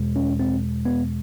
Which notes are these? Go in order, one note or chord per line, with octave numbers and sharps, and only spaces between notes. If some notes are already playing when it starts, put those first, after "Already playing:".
Already playing: E2 B2 G#3
C#4
C4
B3